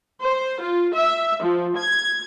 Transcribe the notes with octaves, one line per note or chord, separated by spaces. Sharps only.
C5
F4
E5
F3
G#6